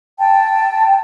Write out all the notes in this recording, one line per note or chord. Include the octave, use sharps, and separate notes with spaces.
G5 A5